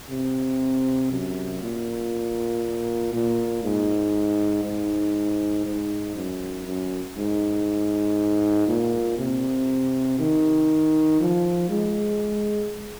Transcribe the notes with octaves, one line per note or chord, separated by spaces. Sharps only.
C3
F#2
A#2
A#2
G#2
G#2
G#2
F#2
F#2
G#2
A#2
C3
D#3
F3
G#3